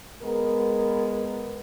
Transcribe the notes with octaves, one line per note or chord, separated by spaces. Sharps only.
G#3 B3 A#4